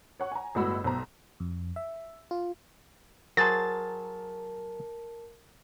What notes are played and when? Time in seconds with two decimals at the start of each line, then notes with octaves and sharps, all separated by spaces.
0.20 C#5 F#5 C#6
0.32 G#5 A#5
0.55 G1 A2 G#3 F#4 B5 E6
0.84 B1 C5 A#5
1.40 F2
1.76 E5
2.31 F4
3.37 F#3 G#4 A#4 C5 A5 A6